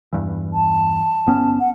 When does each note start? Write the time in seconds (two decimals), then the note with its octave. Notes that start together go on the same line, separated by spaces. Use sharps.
0.13 E2 G2 E3
0.53 A5
1.26 G1 B3 C#4
1.60 F#5